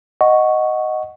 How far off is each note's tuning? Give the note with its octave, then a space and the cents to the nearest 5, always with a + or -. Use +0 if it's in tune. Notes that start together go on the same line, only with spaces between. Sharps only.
D#5 +0 F#5 +0 C#6 +0